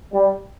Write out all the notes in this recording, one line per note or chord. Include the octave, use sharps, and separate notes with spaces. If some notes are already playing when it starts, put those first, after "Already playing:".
G3